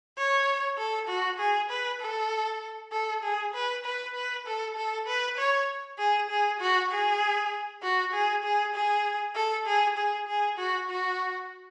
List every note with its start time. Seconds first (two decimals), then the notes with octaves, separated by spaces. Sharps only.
0.17 C#5
0.78 A4
1.08 F#4
1.39 G#4
1.70 B4
2.00 A4
2.92 A4
3.23 G#4
3.54 B4
3.85 B4
4.15 B4
4.46 A4
4.77 A4
5.07 B4
5.37 C#5
5.98 G#4
6.30 G#4
6.60 F#4
6.91 G#4
7.82 F#4
8.13 G#4
8.44 G#4
8.74 G#4
9.35 A4
9.66 G#4
9.98 G#4
10.27 G#4
10.58 F#4
10.89 F#4